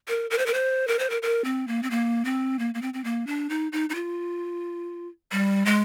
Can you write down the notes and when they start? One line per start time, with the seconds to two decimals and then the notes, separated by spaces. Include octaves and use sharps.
0.08 A#4
0.31 A#4
0.38 C5
0.46 A#4
0.54 C5
0.88 A#4
0.99 C5
1.10 A#4
1.22 A#4
1.45 C4
1.68 A#3
1.83 C4
1.91 A#3
2.25 C4
2.59 A#3
2.74 A#3
2.82 C4
2.94 C4
3.04 A#3
3.27 D4
3.50 D#4
3.72 D#4
3.90 D#4
3.95 F4
5.32 G3
5.66 G#3